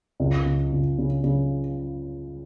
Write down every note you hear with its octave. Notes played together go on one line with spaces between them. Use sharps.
C#2
C#3
C#2
C#3
C#3